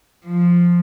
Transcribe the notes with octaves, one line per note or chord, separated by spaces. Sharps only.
F3